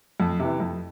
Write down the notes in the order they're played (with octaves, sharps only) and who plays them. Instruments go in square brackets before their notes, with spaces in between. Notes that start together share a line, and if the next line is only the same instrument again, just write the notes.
[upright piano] F2
C3 E3
F2